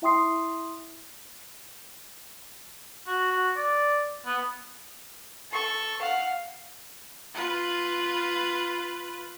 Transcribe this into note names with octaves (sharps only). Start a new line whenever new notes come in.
E4 E5 G5 C6 D#6 C7
F#4
F#4
D5
B3
A4 C#6
F5 F#5
F4 B4